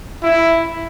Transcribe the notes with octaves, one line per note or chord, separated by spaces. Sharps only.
E4